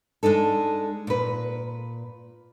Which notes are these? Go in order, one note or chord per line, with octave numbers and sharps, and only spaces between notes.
G#3 D4 D#4 A4
A#2 B4